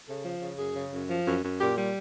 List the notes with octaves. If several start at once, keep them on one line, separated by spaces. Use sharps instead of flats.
C#3 A4
F3
C#3
F#2 G#4
C#3
F#2
F3
F#2
F#2
A#2 G4
G3